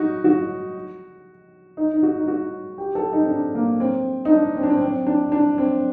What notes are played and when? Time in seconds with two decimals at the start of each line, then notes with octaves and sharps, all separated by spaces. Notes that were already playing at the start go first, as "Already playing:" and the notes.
Already playing: D#4 F#4
0.24 F#4
1.77 D#4
1.93 D#4
2.03 F#4
2.17 D#4
2.28 F#4
2.78 G4
2.95 A4
3.13 D#4
3.22 C4
3.29 D4
3.55 A#3
3.80 C4
4.25 D#4
4.30 D4
4.56 C4
4.63 D4
4.70 C4
4.81 C4
5.07 D4
5.32 D4
5.58 C4